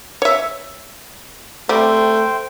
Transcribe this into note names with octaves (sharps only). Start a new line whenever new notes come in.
C#5 E5
G3 A3 C4 C5 G5